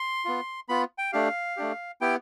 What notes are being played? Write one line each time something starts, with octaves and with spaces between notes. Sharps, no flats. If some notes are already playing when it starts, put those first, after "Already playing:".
Already playing: C6
B3 F4
B3 F4 B5
G5
A3 D4 G4 F5
A3 D4 G4
B3 E4 G4 G5